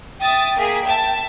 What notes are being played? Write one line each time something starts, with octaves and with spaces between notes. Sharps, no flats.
E5 G5 D#6 A6
A#3 G#4 B6
E5 A5